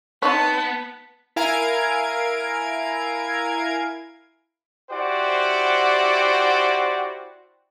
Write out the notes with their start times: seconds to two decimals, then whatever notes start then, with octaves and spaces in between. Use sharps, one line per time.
0.22 B3 C4 D#4 C#5 A5
1.36 E4 A#4 F5 G#5 G#6 D7
4.91 E4 F#4 G4 C5 D5 F#5